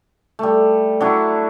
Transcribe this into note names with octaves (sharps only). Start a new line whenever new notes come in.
G3 A3
F#3 D4 E4